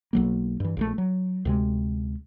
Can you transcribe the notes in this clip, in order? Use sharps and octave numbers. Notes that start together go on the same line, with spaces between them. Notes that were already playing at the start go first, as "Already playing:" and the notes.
B1 F#3 A#3
G2 E3
A#1 C#3 A3
F#3
D2 C3 G#3